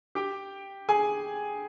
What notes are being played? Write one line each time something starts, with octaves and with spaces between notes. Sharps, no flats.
G4 G5
G#4 G#5